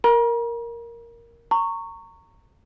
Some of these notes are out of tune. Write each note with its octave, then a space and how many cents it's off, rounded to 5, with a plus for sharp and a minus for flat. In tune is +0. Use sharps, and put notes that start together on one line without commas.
A#4 +0 A#5 +40
A#5 -25 C#6 +0